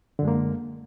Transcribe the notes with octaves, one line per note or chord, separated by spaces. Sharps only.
F#2 D3 G#3 A#3